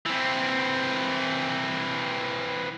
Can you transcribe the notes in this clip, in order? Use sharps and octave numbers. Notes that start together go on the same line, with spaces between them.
E3 C4